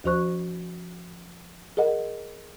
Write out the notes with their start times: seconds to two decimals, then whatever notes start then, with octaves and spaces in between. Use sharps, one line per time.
0.04 D#2 F3 F#4 C5 C#6 F#6
1.77 G#4 A#4 D#5 F#5